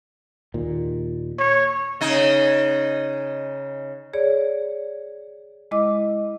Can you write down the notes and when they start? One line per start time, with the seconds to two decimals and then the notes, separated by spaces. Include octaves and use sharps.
0.54 D#2 A#2
1.39 C#5
2.01 C#3 D#4
4.13 G#4 C#5 D5
5.71 G#3 E4 D#5 D6